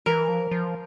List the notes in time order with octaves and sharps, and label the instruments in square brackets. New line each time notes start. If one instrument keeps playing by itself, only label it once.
[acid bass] E3 [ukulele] A#4
[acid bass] F3
F3